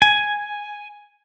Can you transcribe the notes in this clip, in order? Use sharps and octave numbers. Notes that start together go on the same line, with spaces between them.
G#5